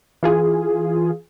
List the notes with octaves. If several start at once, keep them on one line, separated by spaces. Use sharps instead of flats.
E3 F4 G#4